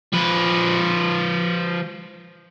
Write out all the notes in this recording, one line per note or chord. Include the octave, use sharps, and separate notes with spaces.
F3 B4